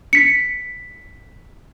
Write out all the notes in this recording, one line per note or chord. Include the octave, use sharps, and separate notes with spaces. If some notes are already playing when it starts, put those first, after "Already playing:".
B6 C#7